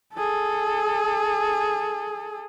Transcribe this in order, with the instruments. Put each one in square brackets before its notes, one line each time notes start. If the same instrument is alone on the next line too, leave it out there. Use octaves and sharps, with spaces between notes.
[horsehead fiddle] G#4 A4